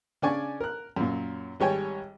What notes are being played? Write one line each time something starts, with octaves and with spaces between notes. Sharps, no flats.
C#3 D4 D5 G#5 C#6
A#4 F#6
F#2 A#2
G#1 G3 C#5 G5 G#5